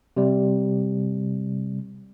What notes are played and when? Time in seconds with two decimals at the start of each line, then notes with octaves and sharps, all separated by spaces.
0.17 C3 G3